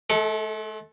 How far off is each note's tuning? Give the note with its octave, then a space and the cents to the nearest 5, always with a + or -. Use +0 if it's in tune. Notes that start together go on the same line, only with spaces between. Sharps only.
A3 -45 A4 +0